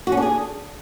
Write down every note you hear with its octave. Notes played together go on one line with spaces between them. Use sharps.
F#4
C#4
D4
G#4